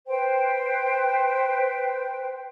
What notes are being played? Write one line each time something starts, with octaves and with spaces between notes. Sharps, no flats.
B4 C5 G5